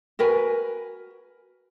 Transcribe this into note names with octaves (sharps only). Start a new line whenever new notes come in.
F#4 A#4 B4 G#5